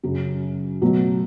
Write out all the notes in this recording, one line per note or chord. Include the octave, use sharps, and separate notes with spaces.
F#2 C#3 F#3
B2 F#3 A3